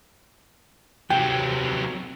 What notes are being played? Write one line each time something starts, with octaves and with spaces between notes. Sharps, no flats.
C3 F#3 G5